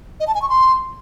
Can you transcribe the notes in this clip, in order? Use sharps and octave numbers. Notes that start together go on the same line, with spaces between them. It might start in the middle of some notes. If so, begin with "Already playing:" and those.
D#5
A5
G#5
C#6
C6